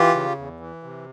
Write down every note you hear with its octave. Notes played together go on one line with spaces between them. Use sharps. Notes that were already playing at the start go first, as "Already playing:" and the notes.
Already playing: E3 F4 G4
C#3
E2
E3
C3